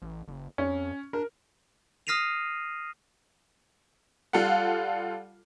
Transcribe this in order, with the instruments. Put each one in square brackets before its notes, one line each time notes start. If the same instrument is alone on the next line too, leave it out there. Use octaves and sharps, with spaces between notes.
[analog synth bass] A1
F#1
[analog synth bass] F2 [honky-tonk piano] C#4
[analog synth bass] D4 [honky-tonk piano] A#4
[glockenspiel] D#6 F6 A#6 C7 D#7 F7
[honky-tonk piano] G3 F4 A4 F5 F#5